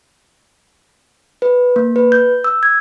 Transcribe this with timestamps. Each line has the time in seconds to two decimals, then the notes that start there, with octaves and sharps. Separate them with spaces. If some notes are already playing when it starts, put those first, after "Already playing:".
1.42 B4
1.76 A#3
1.96 B4
2.12 G6
2.44 E6
2.63 G#6